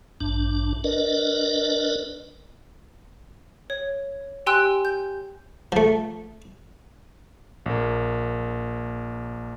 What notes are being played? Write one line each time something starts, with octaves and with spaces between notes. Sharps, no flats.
A1 G2 D4
D4 A#4 B4 D5 D#5
C#5
G4 G5 G#5 C6 E6 F#6
G6
F3 A3
A#1 A#3